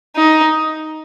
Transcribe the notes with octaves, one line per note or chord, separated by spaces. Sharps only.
D#4